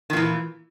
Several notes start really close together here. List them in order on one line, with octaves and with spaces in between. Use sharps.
D#3 A#2 E3